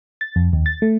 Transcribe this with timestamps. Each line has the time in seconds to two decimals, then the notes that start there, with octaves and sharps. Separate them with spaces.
0.21 A6
0.36 F2
0.53 D#2
0.66 A6
0.82 A3